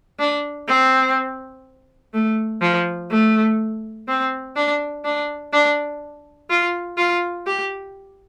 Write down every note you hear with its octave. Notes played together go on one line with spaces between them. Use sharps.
D4
C4
A3
F3
A3
C4
D4
D4
D4
F4
F4
G4